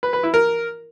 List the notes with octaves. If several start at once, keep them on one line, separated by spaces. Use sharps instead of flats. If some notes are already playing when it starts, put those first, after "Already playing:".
B4
B4
E4
A#4